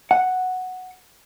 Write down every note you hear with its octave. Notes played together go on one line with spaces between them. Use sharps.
F#5